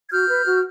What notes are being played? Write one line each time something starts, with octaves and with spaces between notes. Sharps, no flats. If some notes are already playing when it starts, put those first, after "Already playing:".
G#6
F#4 F6 G6
B4
F#4